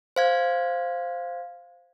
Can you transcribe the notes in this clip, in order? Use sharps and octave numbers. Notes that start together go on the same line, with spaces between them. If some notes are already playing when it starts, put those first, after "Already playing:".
C5 F5 G#6